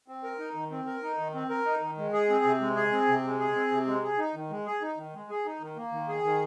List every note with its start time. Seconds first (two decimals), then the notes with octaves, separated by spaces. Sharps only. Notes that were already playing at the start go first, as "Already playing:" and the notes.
0.08 C4
0.24 A#4
0.39 D#4
0.55 D#3
0.71 C4
0.86 A#4
1.03 D#4
1.18 D#3
1.34 C4
1.50 A#4
1.65 D#4
1.82 D#3
1.98 G#3
2.13 G#4
2.30 C4
2.45 C3
2.61 G#3
2.76 G#4
2.92 C4
3.08 C3
3.24 G#3
3.40 G#4
3.55 C4
3.71 C3
3.87 G#3
4.03 G#4
4.18 D#4
4.35 D#3
4.50 G#3
4.66 G#4
4.82 D#4
4.97 D#3
5.14 G#3
5.30 G#4
5.46 D#4
5.61 D#3
5.76 A#3
5.92 D#3
6.08 G#4
6.24 D#3